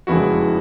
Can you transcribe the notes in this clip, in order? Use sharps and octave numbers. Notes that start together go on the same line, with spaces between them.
F1 E2 C#3 E3 G#3 E4 F#4